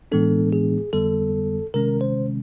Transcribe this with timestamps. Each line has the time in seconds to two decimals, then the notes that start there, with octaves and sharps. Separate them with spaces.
0.12 A2 E3 G#3 B3 D4 A4
0.53 G#4
0.93 F2 D3 G3 B3 A4
1.74 C3 D#3 G#3 C#4 A#4
2.01 C5